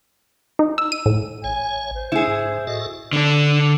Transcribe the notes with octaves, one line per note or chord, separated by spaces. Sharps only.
D#4
E6
D#7
A2
A1 C#5 G#5
C5
C#3 A3 E4 G#4
G#2
A2 F#4 A4 D#5
D3 D4